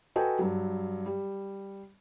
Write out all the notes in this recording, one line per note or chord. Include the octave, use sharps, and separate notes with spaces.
F#4 A4 B4 D#5 G5 G#5
G2 F#3
G3